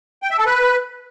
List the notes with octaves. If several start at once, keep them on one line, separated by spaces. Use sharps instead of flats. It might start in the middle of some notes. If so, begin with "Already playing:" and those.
G5
E5
A4
B4